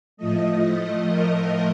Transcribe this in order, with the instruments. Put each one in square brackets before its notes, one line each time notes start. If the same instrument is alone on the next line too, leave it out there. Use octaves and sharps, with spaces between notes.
[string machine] A2 F3 A3 D#5
A#4